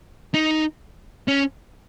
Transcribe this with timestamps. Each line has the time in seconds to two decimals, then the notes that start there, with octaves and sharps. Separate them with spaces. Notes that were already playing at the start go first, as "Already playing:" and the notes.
0.34 D#4
1.28 C#4